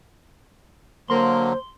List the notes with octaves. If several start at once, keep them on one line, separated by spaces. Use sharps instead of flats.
D3 F#3 A#3 C5 C6